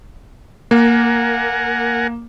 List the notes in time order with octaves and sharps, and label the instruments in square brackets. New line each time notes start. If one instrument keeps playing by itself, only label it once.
[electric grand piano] A#3 [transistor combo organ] A#4 F#5 G#5